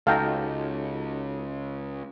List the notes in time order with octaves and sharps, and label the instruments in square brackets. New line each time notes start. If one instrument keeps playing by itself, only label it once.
[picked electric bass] C#2 [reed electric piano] D#4 F#4 A4 [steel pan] F5 G5 A#5